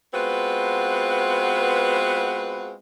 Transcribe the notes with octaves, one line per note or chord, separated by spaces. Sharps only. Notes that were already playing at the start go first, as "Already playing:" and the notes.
G#3 B3 C4 F4 F#4 B4